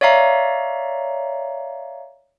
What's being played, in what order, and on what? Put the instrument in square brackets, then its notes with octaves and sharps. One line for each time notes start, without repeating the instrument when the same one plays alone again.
[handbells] C#5 D5 E5 F5 A#5